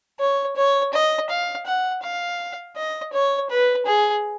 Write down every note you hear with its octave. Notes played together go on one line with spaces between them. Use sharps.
C#5
C#5
D#5
F5
F#5
F5
D#5
C#5
B4
G#4